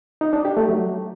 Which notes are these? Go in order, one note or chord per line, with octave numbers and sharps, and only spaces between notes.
D#4
D4
G4
A3
F#3